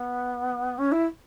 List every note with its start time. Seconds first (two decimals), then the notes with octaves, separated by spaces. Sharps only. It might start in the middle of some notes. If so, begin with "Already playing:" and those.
Already playing: B3
0.78 C#4
0.91 E4